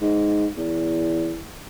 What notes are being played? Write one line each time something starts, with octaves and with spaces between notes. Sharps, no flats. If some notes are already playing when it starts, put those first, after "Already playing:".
G#2
E2